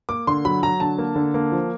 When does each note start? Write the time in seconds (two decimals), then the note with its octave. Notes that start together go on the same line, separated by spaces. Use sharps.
0.09 A#3 D6
0.27 D3 C6
0.45 F#3 B5
0.63 F#3 A#5
0.80 D3 A5
0.98 A#3
1.16 D3
1.34 A#3
1.52 F3